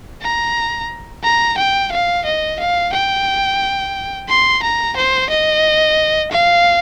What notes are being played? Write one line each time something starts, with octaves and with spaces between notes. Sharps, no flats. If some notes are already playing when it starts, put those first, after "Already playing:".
A#5
A#5
G5
F5
D#5
F5
G5
C6
A#5
C5
D#5
F5